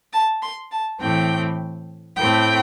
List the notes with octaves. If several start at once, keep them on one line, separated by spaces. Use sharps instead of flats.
A5
C6
A5
A2 E3 A3 C4 G5
A2 A3 C4 G5